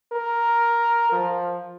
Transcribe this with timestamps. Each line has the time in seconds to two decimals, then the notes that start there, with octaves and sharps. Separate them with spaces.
0.12 A#4
1.12 F3